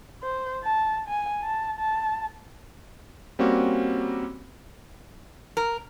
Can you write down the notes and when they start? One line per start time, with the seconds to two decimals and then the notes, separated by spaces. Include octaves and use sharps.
0.23 C5
0.64 A5
1.08 G#5
1.43 A5
1.79 A5
3.39 G3 A#3 C4 C#4 F#4
5.57 A#4